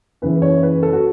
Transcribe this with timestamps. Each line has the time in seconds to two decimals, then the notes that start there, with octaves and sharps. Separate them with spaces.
0.22 F#1 F#2 C#3 E3 B4
0.42 C#5
0.63 B4
0.83 A4
0.93 F#4